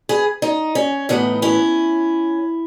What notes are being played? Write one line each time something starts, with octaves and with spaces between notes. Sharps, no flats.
G#4 B4
D#4
C#4
A2 E3 B3 D#4
C#4 E4